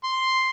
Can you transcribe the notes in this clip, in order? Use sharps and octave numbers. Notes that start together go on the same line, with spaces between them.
C6